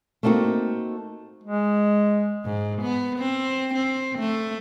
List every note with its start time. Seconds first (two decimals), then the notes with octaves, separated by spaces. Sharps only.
0.23 A3 A#3 C4 D#4 F#4
1.44 G#3
2.45 G#2
2.82 B3
3.19 C4
3.74 C4
4.19 A3